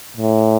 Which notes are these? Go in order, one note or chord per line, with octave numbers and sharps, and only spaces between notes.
A2